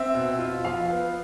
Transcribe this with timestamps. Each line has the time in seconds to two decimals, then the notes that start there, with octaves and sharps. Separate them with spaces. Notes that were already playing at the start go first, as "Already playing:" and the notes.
Already playing: C4 E5
0.14 B2
0.39 F4
0.64 F3 F5
0.90 B3